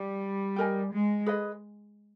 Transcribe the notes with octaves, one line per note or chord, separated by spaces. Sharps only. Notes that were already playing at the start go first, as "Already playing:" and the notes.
Already playing: G3
G4 A#4 D#5 G#5
G#3
G#4 B4 D#5